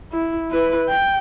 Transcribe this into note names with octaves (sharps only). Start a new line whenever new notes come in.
E4
E4 B4
G5